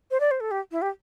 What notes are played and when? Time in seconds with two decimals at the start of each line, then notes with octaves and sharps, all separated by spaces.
0.11 C5
0.20 D5
0.31 C5
0.40 A4
0.51 G4
0.72 E4
0.82 G4